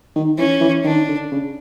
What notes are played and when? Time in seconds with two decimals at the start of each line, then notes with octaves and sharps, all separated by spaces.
0.15 D#3
0.38 E3 C#4
0.61 E3
0.84 D#3 D4
1.08 D3
1.31 C#3